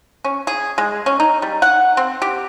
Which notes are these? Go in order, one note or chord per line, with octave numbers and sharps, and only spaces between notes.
C#4
G#4
G#3
C#4
D#4
G3
F#5
C4
G4